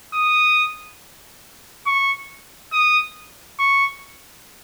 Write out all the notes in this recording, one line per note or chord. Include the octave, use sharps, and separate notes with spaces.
D#6
C#6
D#6
C#6